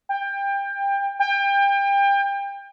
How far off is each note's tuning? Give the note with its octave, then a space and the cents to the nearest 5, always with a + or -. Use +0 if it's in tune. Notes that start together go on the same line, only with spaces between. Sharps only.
G5 +20
G5 +30